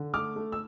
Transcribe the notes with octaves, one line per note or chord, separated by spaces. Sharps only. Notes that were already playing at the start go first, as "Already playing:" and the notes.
Already playing: D3
A3 D6 F6
A3
E6